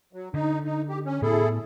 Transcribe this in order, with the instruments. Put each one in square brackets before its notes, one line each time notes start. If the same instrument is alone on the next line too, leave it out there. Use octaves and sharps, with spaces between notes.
[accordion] F#3
[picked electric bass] D3 [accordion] D#4
[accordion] D#4
G4
C#4
[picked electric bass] A2 B3 [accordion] E4 G#4 A4